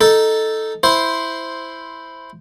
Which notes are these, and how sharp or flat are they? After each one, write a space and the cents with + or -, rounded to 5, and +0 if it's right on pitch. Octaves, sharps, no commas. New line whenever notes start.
D#4 +0 A4 +0
E4 +0 C5 +0